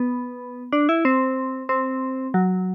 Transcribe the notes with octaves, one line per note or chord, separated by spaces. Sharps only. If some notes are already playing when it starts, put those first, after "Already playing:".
Already playing: B3
D4
E4
C4
C4
F#3